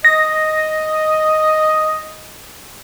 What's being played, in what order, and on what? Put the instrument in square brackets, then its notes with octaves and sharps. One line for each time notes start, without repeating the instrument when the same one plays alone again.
[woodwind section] D#5 [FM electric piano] A#6